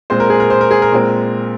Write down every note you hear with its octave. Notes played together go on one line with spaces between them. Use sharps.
A#2 G#3 C4 C5
A#4
G#4
A#4
C5
A#4
G#4
A#4
A#2 G#3 C4